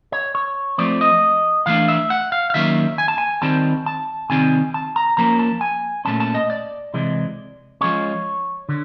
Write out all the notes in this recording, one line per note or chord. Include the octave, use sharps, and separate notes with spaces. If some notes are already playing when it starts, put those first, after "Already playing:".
C#5
C#5
F3 A3 C4 D5
D#5
E3 A3 D4 F5
E5
F#5
F5
F5
D#3 F#3 A#3 C#4 E5
G#5
A5
G#5
D#3 G3 C4 A5
A5
C3 D#3 G3 C4 G#5
A5
A#5
F3 A#3 C#4 A#5
A5
G#5
A#2 F3 A3 C#4 A5
A5
D#5
D5
C3 E3 G#3
F3 G#3 C#4 C#5
D3